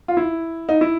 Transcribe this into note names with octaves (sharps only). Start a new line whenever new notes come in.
F4
E4
D#4
E4